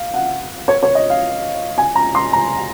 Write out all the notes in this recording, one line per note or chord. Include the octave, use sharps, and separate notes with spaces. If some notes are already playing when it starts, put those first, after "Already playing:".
Already playing: F5
F#5
C#5
C#5
D#5
F5
G#5
A#5
C6
A#5